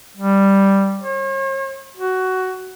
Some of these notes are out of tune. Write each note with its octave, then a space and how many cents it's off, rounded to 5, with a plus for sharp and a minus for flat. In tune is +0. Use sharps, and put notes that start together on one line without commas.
G3 +0
C#5 -45
F#4 +15